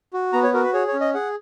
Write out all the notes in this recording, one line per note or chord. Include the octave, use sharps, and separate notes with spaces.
F#4
B3 A#5
C#5
F#4 A#4
B4
G#4 C#5
C#5
C#4
D#5
G#4 F#5